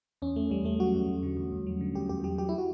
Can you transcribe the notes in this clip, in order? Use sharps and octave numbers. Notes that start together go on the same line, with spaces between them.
E2 C#4
E2 A3
E2 G3
E2 A3
F#3 F#4
E2
E2
D3
E2
E2
F#3
D3
E2 G4
E2 G4
F#3 G4
F#3 G4
E4
F#4